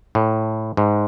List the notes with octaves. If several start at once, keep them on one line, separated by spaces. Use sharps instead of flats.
A2
G#2